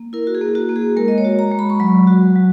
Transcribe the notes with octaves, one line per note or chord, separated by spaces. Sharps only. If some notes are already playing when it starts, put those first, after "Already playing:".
Already playing: A#3
E4 A#4
F#4
G#4
A#3
F#4
A#3
G#4
G#3 A#4
D#5
C#5
F#4
A#5
G#3
B5
C#6
F#3 B5
F#4
F#3